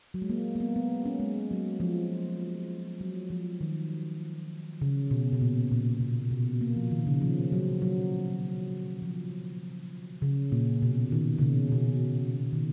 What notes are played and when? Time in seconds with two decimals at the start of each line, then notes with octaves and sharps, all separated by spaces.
0.14 F#3
0.22 G#3
0.30 A#3
0.55 A#3
0.60 B3
0.76 B3
1.06 C#4
1.20 G#3
1.51 F#3
1.80 F3
3.01 F#3
3.30 F3
3.61 D#3
4.81 C#3
5.11 B2
5.33 B2
5.41 A#2
5.71 A#2
6.01 B2
6.31 B2
6.61 A#3
6.76 F3
6.91 D#3
7.07 C#3
7.21 F3
7.52 F#3
7.82 F#3
9.02 F3
10.22 C#3
10.52 A#2
10.82 B2
11.12 D#3
11.38 C#3
11.42 B2
11.72 B2
12.53 D#3